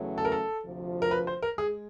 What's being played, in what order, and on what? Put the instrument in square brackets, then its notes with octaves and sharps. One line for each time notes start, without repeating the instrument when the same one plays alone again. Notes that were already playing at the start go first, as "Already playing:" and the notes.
Already playing: [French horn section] E2 C#3 F#3 A3 C#4
[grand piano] A4
A#4
A4
[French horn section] D2 C3 F3
[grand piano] A#4
B4
C5
A#4
[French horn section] G#3 [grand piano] G#4